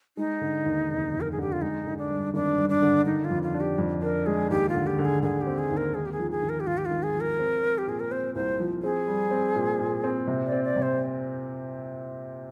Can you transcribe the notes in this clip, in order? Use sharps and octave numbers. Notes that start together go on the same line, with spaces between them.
G#3 D#4
D3
D#2
F1
F1
A#4
G#4
D3 G4
F4
G#3 D#4
D3
D4
G2
G#1 D4
G2
D4
D3
D#3 D#4
F4
F2
F4
D4
G4
F2
D4 A#4
G#3 G#4
D#2 G4
F4
D3
G4
D3
G#4
D3 G#4
G4
C4
G#4
D#2
A#4
G#1 G#4
G4
G#4
F3
G#4
G#1
A#4
G4
G#1 F4
G4
F4
G#1
G#4
F3
A#4
C4
C4
G4
A#2 G#4
A#4
C4 C5
C2 C5
F3
C4 G#4
G3
C4
A#2
A#2
C4
C3
D5
C4
D5
C3
C5